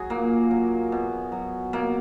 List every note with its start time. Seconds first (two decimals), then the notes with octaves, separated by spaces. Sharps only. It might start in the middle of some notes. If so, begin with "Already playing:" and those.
Already playing: F#3 F#4 G#4
0.10 A#2 A#3
0.51 F#3
0.92 B2
1.32 F#3
1.73 B2 A#3